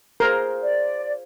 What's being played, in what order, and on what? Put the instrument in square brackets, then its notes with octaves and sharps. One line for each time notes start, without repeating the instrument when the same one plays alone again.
[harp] F4 G#4 C5 [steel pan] A#4
[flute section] D5